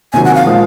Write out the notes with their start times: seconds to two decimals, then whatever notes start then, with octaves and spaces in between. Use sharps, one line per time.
0.13 C3 D#3 F#3 G#5
0.25 F#5
0.35 F5
0.45 A#2 F3 G#3